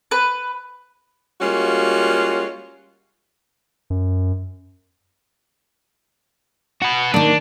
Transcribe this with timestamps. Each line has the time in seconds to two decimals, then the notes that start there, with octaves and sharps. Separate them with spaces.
0.11 B4
1.41 G3 G#3 A#3 C#4 F4 F#4
3.90 F#2
6.82 F#4 B4
7.14 D#3 A#3 D4